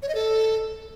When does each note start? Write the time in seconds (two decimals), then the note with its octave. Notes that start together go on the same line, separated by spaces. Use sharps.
0.02 C#5
0.09 D#5
0.15 A4